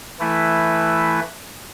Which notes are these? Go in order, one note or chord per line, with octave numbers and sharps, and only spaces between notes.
E3 A3 E4 B4 E5